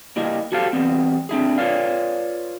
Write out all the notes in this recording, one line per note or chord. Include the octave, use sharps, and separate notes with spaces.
G3 A#3 E4 D#5
F#4 G4 A4 C5 F5
E2 G3 B3 C4
C4 D4 E4 G#4
F4 B4 C#5 D5 F5